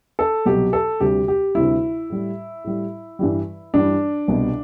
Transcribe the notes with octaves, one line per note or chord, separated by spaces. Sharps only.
A4
C2 B2 F#3 G4
A4
D2 C3 G3 G4
G4
D2 C3 G3 E4
A2 G3
A2 G3
G2 E3 G3
G2 E3 G3 D4
C2 B2 G3